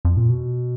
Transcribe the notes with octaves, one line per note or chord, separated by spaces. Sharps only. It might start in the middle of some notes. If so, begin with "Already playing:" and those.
F2
A#2
B2